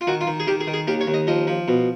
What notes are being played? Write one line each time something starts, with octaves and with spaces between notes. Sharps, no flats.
F4
D#3 F#4
F4
D#3
G#4
D#3 G4
G#4
D#3
G#4
D#2 G4
C#5
D#2
D#5
F3 D#5
F3
B2